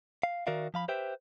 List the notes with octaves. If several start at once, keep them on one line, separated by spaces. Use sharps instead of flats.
F5
D#3 F#4 A#4 D5 E5 F5
F3 F5 B5
G4 B4 C5 E5 G5